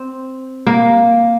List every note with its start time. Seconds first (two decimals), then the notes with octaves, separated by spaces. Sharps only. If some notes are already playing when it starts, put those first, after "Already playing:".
Already playing: C4
0.67 A#3